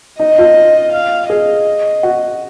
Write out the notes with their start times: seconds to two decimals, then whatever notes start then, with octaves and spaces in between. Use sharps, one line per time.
0.19 D#4 D#5
0.38 F4
0.92 F5
1.29 G#4 D#5
2.03 F#4